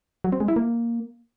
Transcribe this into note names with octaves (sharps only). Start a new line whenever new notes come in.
F#3
C4
G#3
E4
A#3